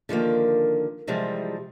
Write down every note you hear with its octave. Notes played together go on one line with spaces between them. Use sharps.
D3 D#3 F3 A#3
C3 E3 F3 G3 G#3